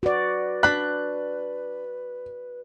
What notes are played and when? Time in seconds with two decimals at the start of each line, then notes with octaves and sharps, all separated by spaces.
0.03 F#4 B4 D5
0.63 D4 B5 F#6